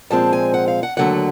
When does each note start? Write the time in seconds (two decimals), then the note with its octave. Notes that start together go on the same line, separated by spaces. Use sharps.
0.11 A#2 F3 G#3 C4 A5
0.33 G#5
0.54 F#5
0.68 F5
0.83 F#5
0.97 D#2 D3 F#3 A3 F#5